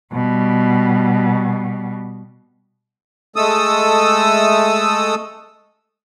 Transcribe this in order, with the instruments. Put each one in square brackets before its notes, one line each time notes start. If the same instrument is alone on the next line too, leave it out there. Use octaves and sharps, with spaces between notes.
[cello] B2 G3
[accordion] G#3 A3 A4 D#6 E6